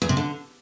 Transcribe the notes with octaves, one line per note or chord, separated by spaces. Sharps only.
E2
C3
D3